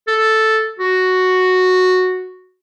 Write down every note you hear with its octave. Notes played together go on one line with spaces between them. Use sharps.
A4
F#4